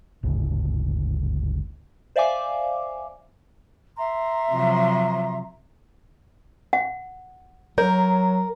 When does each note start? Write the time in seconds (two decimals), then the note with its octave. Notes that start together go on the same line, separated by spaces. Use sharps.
0.23 G1 D2 G#2 C#3
2.16 C5 D5 E5 F5 G#5 D6
3.96 E5 A#5 C6
4.51 C3 F3 F#3
6.73 F#5
7.78 F#3 A#4 C#5